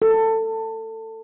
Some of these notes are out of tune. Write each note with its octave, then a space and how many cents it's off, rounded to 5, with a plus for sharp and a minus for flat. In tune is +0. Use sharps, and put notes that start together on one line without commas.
A4 +20